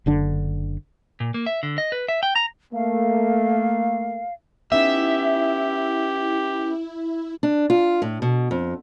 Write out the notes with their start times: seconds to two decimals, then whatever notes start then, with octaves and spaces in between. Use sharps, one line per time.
0.06 F#1 D3 D4
1.20 A#2
1.34 A#3
1.46 E5
1.63 D3
1.78 D#5
1.92 B4
2.08 E5
2.23 G5
2.36 A#5
2.73 A3 A#3 F5
4.72 B3 C#4 D#4 E4 G4 E5
7.43 D4
7.70 F4
8.02 A2
8.22 B2
8.51 F2